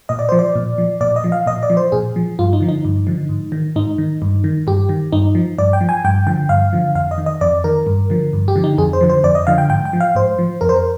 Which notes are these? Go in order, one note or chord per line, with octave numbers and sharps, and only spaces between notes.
A#2 D#5
D5
F3 C5
D5
A#2
F3
A#2 D5
D#5
F3
F5
A#2 D#5
D5
F3
C5
A#2 G#4
F3
G2 F4
D#4
D3 F3
D#4
G2
D3 F3
G#2
D#3
G#2 D#4
D#3
G2
D#3
G2 G4
D#3
G2 D#4
F3
G2 D5
G5
F3
G#5
G2 G5
D3 F3 G5
G2 F5
D3 F3
F2 F5
D#5
D#3
D#5
F2 D5
D#3 A#4
G2
D3 F3
G2
G4
D3 F3
D#4
F2 G#4
C5
D3 F3
C5
F2 D5
D#5
D3 F3 F5
G5
G#2 G5
G5
F3
F5
G#2 C5
F3
F2 A#4
C5
A#4